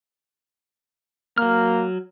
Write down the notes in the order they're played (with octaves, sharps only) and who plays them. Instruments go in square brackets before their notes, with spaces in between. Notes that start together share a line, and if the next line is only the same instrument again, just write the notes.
[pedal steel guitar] F#3 F6 [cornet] A#3